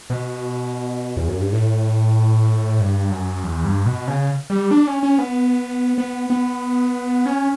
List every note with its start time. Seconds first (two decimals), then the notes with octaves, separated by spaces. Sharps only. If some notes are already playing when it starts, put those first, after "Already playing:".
0.10 B2
1.17 E2
1.28 F#2
1.40 G2
1.53 A2
2.81 G2
3.12 F#2
3.44 E2
3.65 G2
3.86 B2
4.07 C#3
4.50 G3
4.71 D4
4.87 C#4
5.03 C#4
5.18 B3
5.98 B3
6.30 B3
7.26 C#4